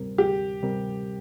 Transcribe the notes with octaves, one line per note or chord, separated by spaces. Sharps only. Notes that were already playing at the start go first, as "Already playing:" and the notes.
Already playing: D2 C3 G3 C4 A#4
D2 G4
C3 G3 C4 A#4